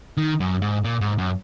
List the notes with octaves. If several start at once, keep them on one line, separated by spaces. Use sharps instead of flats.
D#3
F#2
G#2
A#2
G#2
F#2